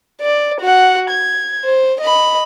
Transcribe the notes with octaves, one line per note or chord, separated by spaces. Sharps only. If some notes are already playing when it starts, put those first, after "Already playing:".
D5
F#4 F#5
G#6
C5
D#5 B5